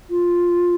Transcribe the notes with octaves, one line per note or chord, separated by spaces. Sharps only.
F4